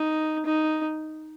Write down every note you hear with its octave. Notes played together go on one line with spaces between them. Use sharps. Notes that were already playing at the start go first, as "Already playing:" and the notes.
Already playing: D#4
D#4